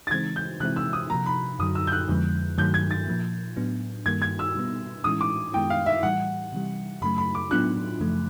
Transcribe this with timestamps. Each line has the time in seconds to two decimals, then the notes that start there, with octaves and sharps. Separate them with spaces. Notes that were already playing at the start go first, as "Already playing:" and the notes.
0.07 A6
0.11 C#3 E3 G#3 C4 D#4 G#6
0.36 G6
0.60 C3 E3 G#3 C4 E4 F#6
0.76 E6
0.93 D#6
1.10 C3 F3 A#3 A#5
1.26 B5
1.59 F#2 D3 F#3 D#6
1.75 E6
1.87 G6
1.92 F#6
2.08 F2 D3 F3 G#3 B3
2.58 G2 D#3 F#3 A3 G6
2.74 G#6
2.91 A6
3.07 A#2 F3 A#3
3.56 A2 F#3 B3 D4
4.06 G2 D#3 G3 A#3 G#6
4.22 G#6
4.39 E6
4.55 B2 G3 B3
5.04 A2 E3 G#3 C#4 E4 D#6
5.21 D6
5.53 F#2 D#3 G#3 B3 E4 G5
5.70 F5
5.86 E5
6.03 A2 E3 G3 F#5
6.52 C3 E3 G3
7.01 F#2 C#3 F#3 A3 B5
7.18 B5
7.35 D6
7.51 A2 F#3 B3 D4 F4 F#6
8.00 F#2 C#3 F3 A3